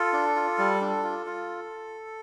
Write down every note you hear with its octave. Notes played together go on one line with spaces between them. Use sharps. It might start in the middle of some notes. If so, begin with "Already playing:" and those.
Already playing: F4 A4
D4
F4
G3
D4
F4
F4